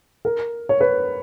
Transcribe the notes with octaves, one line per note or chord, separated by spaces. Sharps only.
A#4
C#5
B4